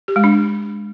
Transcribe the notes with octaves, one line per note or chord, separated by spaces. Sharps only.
G4
G#3
D4